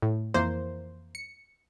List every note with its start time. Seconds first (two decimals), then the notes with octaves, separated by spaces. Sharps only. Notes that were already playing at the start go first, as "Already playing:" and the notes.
0.02 A2
0.34 F2 E3 A#3 C5
1.15 C#7